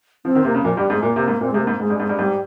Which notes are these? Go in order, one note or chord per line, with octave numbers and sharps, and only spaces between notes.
F3 C4
D#3
C3 A#3
C#3
A#2 F3
G2 G3
G#2 G#3
A#2 A#3
C3
G#2
A#2 C4
C3 G#3
A#3
G#2
G#2 G#3
G2
G#2 G#3
G2
G#2 G3